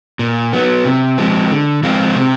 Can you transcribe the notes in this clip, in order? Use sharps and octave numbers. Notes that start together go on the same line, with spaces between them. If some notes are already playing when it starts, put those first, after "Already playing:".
A#2
F#3 B3
C3
F3 G#3 C4
D3
F3 G#3 C4 F4
C3